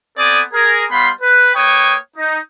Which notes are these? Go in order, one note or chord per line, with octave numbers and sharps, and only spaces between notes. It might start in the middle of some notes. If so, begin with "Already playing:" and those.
B3 C4 A4 D5 G#5 D#6
G#4 A#4
G3 B3 F5 B5 C6
B4
A#3 B4 C#5 G5 C#6 D#6
D#4